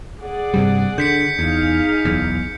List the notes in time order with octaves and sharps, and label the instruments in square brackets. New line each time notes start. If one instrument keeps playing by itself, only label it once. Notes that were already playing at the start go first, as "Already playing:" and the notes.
[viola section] G#4 D5 F#5
[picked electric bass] G2 C3 G3
[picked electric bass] D3 [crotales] G6 B6 C#7
[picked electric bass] E2 [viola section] D#4 G#4 F5
[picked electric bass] D1 B1 E2